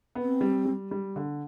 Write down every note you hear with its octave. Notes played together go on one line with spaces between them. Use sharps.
B3
C4
G3
G3
G3
D3